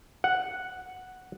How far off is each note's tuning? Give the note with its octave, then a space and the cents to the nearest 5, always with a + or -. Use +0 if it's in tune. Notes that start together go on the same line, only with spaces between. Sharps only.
F#5 +0